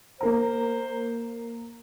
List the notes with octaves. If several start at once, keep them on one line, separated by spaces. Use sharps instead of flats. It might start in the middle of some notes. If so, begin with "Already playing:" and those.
A#3 A#4 C5 A#5